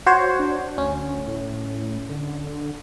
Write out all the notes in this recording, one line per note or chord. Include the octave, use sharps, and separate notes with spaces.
F#4 C5 C#5
D4
D2 C#4
A2
D3